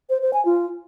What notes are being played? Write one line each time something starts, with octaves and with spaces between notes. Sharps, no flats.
C5
C5
G#5
F4